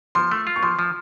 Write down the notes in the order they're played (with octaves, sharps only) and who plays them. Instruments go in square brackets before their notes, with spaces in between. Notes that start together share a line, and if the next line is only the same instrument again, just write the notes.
[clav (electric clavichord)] F3 [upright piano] C6
[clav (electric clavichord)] A3
F4
[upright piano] C#6
[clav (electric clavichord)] F3 [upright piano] C6
[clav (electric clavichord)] F3